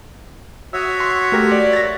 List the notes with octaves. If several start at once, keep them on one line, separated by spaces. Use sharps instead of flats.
F#4 C#5 E5 D#6 E6
C6
A3 G4 A#4
D5
A6 A#6